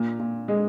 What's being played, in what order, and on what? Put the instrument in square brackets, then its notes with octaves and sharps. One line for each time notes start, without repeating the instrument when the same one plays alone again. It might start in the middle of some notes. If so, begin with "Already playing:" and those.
Already playing: [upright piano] A#2
A#2
G#3